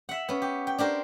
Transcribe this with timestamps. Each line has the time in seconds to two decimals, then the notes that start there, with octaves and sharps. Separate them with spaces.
0.09 E5 F#5
0.29 B3 C#4
0.42 G4
0.67 G5
0.78 D4 G4 A#4 C5